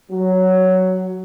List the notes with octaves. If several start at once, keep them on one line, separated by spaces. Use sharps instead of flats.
F#3